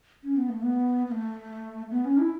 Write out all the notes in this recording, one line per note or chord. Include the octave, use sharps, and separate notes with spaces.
C#4
B3
A3
B3
B3
A3
B3
C#4
E4